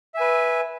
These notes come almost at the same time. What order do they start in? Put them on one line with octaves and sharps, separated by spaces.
E5 G#5 B4